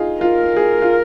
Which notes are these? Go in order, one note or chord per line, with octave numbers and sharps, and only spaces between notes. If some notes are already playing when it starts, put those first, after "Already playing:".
Already playing: D#4 F4 G#4
F4 A#4
G#4
F4